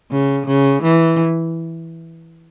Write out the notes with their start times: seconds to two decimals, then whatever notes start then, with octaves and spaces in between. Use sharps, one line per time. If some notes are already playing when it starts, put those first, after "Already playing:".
0.11 C#3
0.47 C#3
0.82 E3